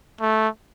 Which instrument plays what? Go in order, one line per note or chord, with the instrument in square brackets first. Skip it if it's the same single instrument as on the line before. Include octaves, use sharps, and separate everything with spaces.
[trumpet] A3